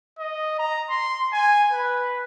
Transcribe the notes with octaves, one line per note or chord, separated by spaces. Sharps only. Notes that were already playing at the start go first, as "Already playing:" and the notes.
D#5
A#5
C6
G#5
B4